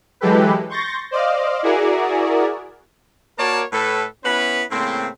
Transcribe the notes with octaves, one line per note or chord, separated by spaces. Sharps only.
E3 F#3 G#3 G4 A4 B4
C6 C#6 G6 A6 A#6
C5 D5 D#5 F5
E4 F#4 G#4 A#4 D5
A#3 F#4 A#4 C#5 D5 A5
A2 A4 B4
B3 C#4 E4 B4
A2 C#3 A#3 C4